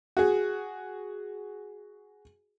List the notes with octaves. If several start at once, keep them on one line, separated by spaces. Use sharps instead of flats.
F#4 G#4